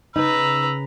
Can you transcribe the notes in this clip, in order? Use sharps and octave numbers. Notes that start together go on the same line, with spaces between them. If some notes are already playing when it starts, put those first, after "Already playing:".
C#3 D#4 B4 A#5 E6